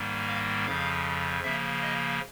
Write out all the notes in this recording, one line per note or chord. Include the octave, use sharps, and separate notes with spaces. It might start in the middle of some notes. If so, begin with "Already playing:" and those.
Already playing: G#2 D#3 G3 A#3
F5
F2 C#3 F3 F5
C#3 F3 A#3 E5
D#5